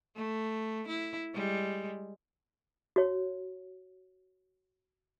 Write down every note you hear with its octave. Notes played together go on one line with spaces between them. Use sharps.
A3
E4
G3 G#3
F#4 C#5